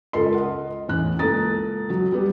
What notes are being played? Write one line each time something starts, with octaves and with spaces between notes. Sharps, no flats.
C#2 F4 A4 A#4 D#5 C6
D#5 F#5
E2 A2 C#4 F#6
C#2 A#3 A4 A#5 D#6 A6
F#3
G3 B3 G4